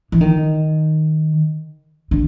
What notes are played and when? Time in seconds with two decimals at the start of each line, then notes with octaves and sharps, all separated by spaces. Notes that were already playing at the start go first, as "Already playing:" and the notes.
0.12 E3
0.21 D#3
2.11 D3